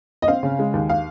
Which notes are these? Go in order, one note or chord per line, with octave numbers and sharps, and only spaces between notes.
D#5
C4 F5
C#3
G#3
D#2
F5